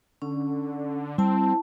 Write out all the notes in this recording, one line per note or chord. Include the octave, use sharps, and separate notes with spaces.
D3 C#4
G3 C4 E4 A5